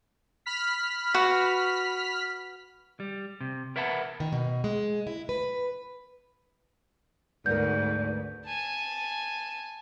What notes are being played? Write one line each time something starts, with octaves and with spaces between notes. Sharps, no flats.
B5 F6 B6
F#4 B4
G3
C3
A#4 B4 E5 F#5 A5 B5
D#3
B2
G#3
E4
B4
D2 G#2 B3 A#4 D5 G6
G#5 A5